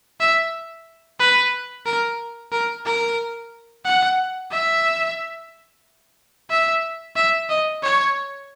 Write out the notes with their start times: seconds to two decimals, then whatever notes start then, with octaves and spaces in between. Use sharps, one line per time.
0.20 E5
1.20 B4
1.86 A#4
2.52 A#4
2.86 A#4
3.85 F#5
4.51 E5
6.50 E5
7.16 E5
7.49 D#5
7.83 C#5